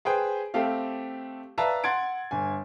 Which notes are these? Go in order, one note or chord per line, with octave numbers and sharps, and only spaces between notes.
G#4 B4 C5 G5
A3 C4 G4 F5
B4 D5 E5 F5 A5 A#5
F#5 C6 G#6 A6 D7
G1 G#5